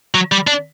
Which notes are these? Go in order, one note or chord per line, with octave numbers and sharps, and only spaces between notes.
F#3
G3
D4